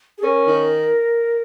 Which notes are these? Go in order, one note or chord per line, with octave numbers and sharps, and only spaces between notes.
G#4
C#4 A#4
D#3